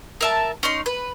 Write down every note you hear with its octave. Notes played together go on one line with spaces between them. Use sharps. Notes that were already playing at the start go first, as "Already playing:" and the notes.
A#4 E5 A5
C#4 D#4 C6
B4